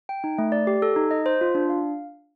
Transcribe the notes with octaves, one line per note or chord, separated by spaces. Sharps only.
G5
D#4
A3
D5
G4
A4
D#4
D#5
C5
F4
D4
F5